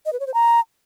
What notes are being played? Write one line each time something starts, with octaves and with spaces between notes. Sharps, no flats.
D#5
B4
C#5
C5
A#5